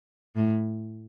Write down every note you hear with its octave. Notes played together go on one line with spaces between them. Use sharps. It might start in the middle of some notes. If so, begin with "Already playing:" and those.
A2